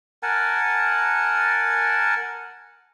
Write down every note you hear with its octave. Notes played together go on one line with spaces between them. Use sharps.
A#4 F#5 G#5 A5